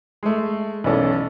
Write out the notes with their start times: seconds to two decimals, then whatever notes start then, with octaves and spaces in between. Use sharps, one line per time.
0.23 G#3 A3
0.84 B1 E3 B3 C#4 A4 D5